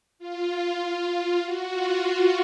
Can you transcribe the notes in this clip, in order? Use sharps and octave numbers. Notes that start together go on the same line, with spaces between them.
F4
F#4
F4
F#4